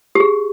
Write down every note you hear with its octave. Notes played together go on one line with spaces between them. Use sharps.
G4
G#4